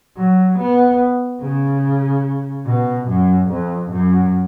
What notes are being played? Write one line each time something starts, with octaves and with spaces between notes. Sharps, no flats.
F#3
B3
C#3
B2
F#2
F2
F#2